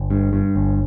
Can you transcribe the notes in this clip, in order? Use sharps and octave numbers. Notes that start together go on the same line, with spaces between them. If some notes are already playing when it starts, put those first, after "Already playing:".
Already playing: G1
G2
G2
G1